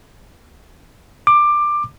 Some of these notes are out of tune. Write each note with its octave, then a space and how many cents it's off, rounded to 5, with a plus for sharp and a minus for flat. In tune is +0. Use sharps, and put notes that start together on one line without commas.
D6 +15